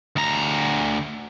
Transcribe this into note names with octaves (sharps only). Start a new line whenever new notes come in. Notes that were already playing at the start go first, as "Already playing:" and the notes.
D2 A#5